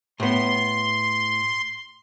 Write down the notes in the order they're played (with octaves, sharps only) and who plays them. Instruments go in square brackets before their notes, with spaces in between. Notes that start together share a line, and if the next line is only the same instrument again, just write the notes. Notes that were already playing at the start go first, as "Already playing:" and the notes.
[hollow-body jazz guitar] A2 B3 [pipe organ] C6